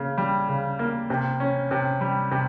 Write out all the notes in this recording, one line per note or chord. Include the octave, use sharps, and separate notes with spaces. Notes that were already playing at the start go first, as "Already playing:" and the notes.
Already playing: C#3 A#3
G3
C#3
A#3
C3
C#4
C3
G3
C3